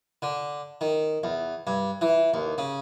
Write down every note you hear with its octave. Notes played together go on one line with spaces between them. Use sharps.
D3
D#3
E2
G2
E3
D#2
C#3